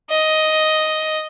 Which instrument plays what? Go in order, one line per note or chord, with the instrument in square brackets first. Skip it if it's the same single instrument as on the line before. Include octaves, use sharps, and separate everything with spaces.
[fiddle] D#5